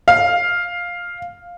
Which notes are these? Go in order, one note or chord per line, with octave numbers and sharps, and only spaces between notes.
F5